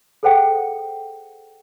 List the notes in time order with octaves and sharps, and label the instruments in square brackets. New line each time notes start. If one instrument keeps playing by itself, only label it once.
[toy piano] G#4 A4 C5 F#5 G5